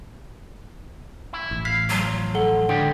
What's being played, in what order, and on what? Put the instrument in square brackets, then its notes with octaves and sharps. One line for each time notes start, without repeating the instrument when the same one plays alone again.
[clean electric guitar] E4
[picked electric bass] A1
[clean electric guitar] F5 [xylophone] B6
[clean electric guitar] F3 [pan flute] F#3
[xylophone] A4 F#5 G7
[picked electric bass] D3 [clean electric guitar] G3 G#3 G4 [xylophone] G5